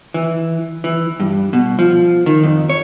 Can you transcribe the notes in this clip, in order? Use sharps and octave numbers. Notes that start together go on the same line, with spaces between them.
E3
E3
G2
B2
F3
D#3
F2
C#5